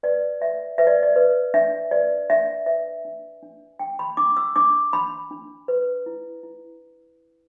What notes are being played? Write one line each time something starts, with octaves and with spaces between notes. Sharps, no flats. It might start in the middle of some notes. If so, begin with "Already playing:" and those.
B4 D5
B4 E5
B4 E5
D5
D5
B4
D4 E5
B4 D5
D4 E5
B4 E5
D4
D4
D4 G5
B5
D4 D6
E6
D4 D6
D4 B5
D4
B4
E4
E4